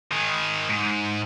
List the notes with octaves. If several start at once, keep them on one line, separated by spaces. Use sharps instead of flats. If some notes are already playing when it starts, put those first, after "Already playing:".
D#3 G#4
G#2